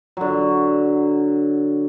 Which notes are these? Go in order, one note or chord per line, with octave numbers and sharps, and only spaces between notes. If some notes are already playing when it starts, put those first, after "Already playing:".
D3 F#3